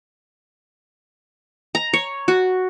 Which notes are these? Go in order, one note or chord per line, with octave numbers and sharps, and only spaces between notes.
A#5
C#5
F#4